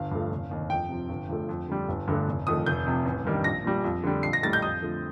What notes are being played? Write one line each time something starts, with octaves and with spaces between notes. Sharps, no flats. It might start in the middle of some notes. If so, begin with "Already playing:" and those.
Already playing: G1 F5
G2 F3 A3
F1
D#2 D#3
F2 G5
C3 F3
G1
G2 F3 A3
F2
D3 G3
G1
G2 D3 A3
F1
F2 D#3 A3 D#6
F1 G6
F2 C3
A1
G2 D#3 G3
A#1 A#6
A#2 G3
F2
D3 G3
A#1 C7
A#6
A2 G3 A6
G6
F2 D#6
D3 F3 A3